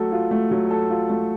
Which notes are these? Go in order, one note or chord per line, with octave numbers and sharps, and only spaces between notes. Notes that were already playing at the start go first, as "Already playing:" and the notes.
Already playing: F#3 A3 A4
F4
A3
F#3
A4
F4
A3